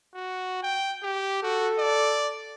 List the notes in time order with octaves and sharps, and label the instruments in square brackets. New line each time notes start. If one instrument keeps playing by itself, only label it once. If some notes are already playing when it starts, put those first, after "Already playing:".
[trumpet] F#4
G5
G4
[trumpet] F#4 [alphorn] A4
[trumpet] D5